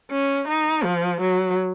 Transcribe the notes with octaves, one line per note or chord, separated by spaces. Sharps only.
C#4
D#4
F3
F#3